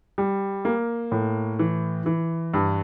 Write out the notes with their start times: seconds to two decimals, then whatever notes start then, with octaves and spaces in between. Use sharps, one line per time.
0.18 G3
0.65 A#3
1.12 A2
1.59 E3
2.06 E3
2.54 G2